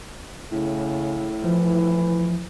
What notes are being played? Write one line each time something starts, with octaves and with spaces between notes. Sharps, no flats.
A2 C#3
E3 F3